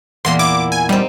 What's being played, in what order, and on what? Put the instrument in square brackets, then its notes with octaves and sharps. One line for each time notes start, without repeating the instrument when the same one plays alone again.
[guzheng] E2 A#2 A#3 [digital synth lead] C6
[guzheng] E4 [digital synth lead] D6
[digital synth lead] G#5
[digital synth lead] G3 [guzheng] C4 D#4